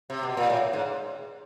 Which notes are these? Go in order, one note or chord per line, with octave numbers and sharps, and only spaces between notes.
C3
B2
A#2
A2
G#2